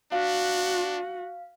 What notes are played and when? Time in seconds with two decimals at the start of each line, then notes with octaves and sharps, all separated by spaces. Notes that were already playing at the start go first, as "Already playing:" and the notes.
0.12 D4 F#4 F5